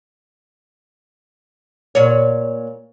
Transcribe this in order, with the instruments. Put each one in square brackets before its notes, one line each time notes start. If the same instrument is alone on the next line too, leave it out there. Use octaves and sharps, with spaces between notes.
[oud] A#2 C#5